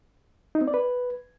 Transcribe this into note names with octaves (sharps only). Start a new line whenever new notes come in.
D#4
C4
D5
B4